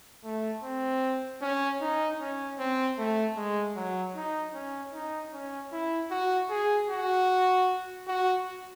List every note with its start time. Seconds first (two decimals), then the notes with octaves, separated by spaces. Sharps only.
0.24 A3
0.63 C4
1.42 C#4
1.81 D#4
2.20 C#4
2.59 C4
2.99 A3
3.37 G#3
3.76 F#3
4.16 D#4
4.55 C#4
4.94 D#4
5.33 C#4
5.72 E4
6.11 F#4
6.50 G#4
6.90 F#4
8.08 F#4